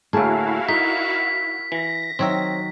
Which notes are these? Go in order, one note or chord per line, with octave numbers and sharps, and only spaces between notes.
D2 A2 A#3 E4 F#4 G#4 F5 A5
D#4 A#4 B6
E3 A#6
D#3 F#3 C4 C#5 E5